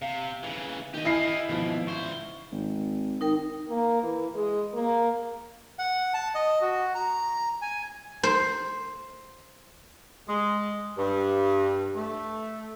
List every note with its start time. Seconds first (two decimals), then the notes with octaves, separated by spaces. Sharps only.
0.02 C3 F5
0.43 C#3 E3
0.94 D#3 G4 D#5
1.05 E4 G#5 F6 A#6 C7
1.49 G#1 B2 E3 F3
1.87 C#2 C5 C#6
2.52 G#1
3.21 D#4 A#4 G5
3.69 A#3
4.03 E3
4.35 G#3
4.74 A#3
5.79 F#5
6.14 A5
6.35 D#5
6.61 F#4
6.95 A#5
7.62 G#5
8.23 C5
10.28 G#3
10.98 G2
11.96 A3